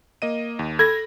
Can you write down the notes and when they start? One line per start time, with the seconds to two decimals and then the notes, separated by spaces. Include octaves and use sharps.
0.22 A#3 D#5 D#7
0.59 D#2
0.79 A4 B5 G#6 A#6